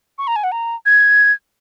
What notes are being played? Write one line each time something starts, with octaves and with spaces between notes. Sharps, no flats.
C#6
A#5
G#5
F#5
A#5
G#6